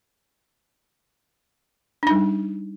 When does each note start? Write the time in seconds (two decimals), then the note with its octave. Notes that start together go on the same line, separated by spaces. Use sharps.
2.03 D4
2.07 D#4
2.11 G3